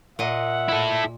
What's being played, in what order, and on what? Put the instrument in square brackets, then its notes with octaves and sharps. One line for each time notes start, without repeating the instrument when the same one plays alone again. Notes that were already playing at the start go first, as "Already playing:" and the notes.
[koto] A#2 D#5 [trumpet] E5 [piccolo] F#5
[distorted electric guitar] E4 A4